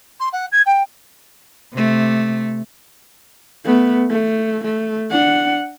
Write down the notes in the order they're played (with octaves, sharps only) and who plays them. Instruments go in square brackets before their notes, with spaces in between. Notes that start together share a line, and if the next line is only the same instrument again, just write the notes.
[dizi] C6
F#5
G#6
G5
[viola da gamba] C3 A3
[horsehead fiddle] A3 B3
A3
A3
D4 F#5